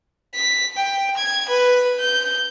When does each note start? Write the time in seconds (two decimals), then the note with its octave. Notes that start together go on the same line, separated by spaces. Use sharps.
0.35 B6
0.76 G5
1.17 G#6
1.49 B4
2.00 G6